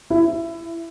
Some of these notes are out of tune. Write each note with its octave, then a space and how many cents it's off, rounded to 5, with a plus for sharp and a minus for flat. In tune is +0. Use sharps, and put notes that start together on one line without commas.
E4 +20